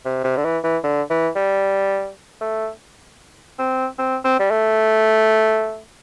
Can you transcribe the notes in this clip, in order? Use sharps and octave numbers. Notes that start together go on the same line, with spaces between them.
C3
C3
D3
E3
E3
D3
E3
G3
A3
C4
C4
C4
G3
A3